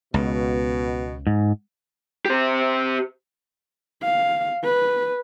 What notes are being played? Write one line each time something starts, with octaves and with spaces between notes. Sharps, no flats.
C#2 B2
G#2
G4 C5
F5
B4